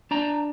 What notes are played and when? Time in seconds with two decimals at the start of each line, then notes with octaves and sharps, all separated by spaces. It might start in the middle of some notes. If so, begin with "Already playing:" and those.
0.11 D4 A#5